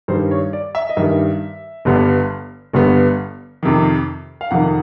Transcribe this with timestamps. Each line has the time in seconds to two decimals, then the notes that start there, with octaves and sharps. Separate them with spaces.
0.08 G2 D#3 G3 C5
0.31 C#5
0.53 D5
0.75 E5
0.89 D#5
0.97 G2 D#3 G3 E5
1.85 G1 G2 D3 G3 B3
2.73 G1 G2 D3 G3 B3
3.63 F2 C3 D#3
4.41 F5
4.51 F2 C3 D#3 F#5